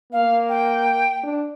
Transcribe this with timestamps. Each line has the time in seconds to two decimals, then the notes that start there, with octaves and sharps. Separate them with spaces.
0.13 A#3 F5
0.49 G5
1.24 D4